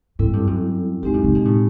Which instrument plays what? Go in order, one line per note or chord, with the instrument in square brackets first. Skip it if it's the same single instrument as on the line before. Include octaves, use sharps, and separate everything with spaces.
[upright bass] G#2 [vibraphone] G3 C4 E4 A4
[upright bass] G2
F#2
[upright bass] G2 [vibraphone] G#3 C4 D#4 G4
[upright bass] F#2
C3
B2
A2